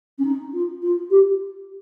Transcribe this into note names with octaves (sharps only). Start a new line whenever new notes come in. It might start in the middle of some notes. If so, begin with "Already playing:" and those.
C#4
D#4
F4
F4
G4